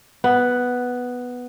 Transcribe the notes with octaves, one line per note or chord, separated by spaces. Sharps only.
B3